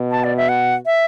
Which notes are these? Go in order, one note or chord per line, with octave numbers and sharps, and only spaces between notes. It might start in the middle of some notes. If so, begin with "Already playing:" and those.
Already playing: B2
A5
D5
E5
F#5
E5